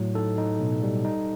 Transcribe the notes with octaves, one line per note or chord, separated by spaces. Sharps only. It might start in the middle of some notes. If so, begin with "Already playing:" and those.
Already playing: A2 F#3
D#4 A4
D#4
B2
G3
D#4